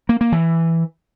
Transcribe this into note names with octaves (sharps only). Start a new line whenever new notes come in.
A#3
A#3
E3